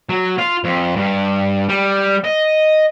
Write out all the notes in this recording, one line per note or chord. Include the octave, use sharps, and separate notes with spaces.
F#3
F4
F2
G2
G3
D#5